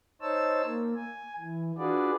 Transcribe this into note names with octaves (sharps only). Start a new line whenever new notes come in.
D#4 C5 C#5 A5 E6
A#3
G#5
E3
D4 F4 F#4 G#4 B4 D5